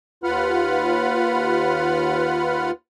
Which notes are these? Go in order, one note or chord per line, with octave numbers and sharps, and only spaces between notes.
D#2 F4 B4 F#5 B5 F6